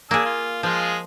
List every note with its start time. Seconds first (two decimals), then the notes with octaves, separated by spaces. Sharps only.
0.11 A#3 D4 G#4 E6
0.25 F4
0.63 F3 G#3 F4 G#4